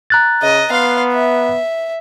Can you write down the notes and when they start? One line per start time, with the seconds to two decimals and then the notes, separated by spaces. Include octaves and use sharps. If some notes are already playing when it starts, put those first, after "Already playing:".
0.10 A#5 F#6 A6
0.42 C#3 D#5
0.71 B3 F5 C6
1.13 E5